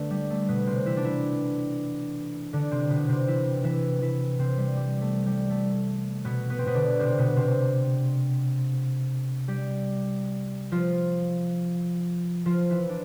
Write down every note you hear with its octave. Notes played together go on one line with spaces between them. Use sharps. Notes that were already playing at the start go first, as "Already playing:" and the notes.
Already playing: D3 A3 B3 D4
G3
A3
B2 B3
C3 C4
E3 E4
D4
E3 E4
D3 D4
C3 C4
B2 B3
C3 C4
E3 E4
E3 E4
E3 E4
C3 C4
G3
G3
A3
G3
A3
B2 B3
B3
C4
B2 B3
D3 D4
C3 C4
B2 B3
C3 C4
G3 G4
F3 F4
F3 F4
E3 E4
D4